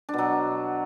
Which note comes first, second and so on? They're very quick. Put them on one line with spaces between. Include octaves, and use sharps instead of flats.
D4 B2 F#3